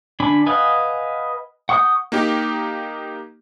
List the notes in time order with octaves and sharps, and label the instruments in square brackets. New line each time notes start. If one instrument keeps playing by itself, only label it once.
[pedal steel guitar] D3 D4 G#5 B5
B4 D#5 F5 F#5 G#5
F#5 C#6 D#6 F#6 G6
[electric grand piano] A#3 D#4 G4